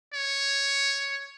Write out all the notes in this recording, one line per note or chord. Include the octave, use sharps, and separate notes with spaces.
C#5